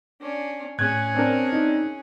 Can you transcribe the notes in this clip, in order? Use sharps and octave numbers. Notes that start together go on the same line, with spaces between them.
C#4 D4
A2 C#4 G#4 F#6 G#6
C4 D4 A#4
D#4